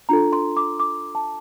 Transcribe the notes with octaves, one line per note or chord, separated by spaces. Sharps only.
D4 F4 A4 A#5
C6
D6
D6
A5